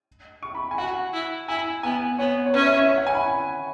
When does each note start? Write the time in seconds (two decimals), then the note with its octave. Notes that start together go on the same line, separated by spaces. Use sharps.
0.43 C#6
0.55 B5
0.71 G#5
0.78 F#4 F#5
1.13 E4
1.48 E4 G#5
1.83 B3 G#5
2.19 B3 C#5
2.46 C#5
2.53 C#4 B4
2.61 E5
2.65 C#5
2.77 E5
2.89 C#5
2.98 F#5
3.07 G#5
3.15 B5